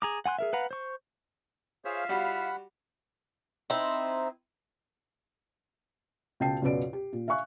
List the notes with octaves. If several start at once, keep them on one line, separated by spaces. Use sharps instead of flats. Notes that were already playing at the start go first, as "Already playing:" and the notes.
G#4 A#5 D6
F#5 G#5 C6 F#6
G#4 A#4 E5
B4 F5 F#5 A#5 B5
C5 C#6
F4 G#4 C5 C#5 E5 F5
G3 F#4 F#5 B5
C4 D#4 E4
C#2 B2 G5 A5 C7
C#2 F#2 B2 B4 D5 D7
G4
A#2
E5 F5 G#5 C#6 F#6